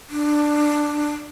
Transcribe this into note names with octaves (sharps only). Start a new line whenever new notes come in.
D4